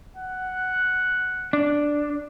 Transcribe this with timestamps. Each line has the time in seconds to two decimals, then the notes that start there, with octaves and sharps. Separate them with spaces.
0.17 F#5
1.53 D4